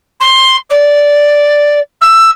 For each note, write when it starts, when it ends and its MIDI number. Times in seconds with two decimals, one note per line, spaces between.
0.20 0.56 84
0.70 1.79 74
2.01 2.30 88